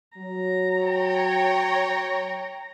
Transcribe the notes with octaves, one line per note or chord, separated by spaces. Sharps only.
F#3 A#5
C#5 G5